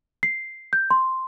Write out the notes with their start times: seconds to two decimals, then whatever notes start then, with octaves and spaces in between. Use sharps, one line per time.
0.23 C7
0.73 G6
0.91 C6